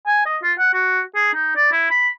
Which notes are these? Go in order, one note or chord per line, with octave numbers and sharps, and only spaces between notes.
G#5
D#5
F4
F#5
F#4
G#4
D#4
D5
E4
B5